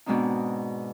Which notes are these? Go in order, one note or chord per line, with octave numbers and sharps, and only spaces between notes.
G#2 B2 G#3 C4 D4 D#4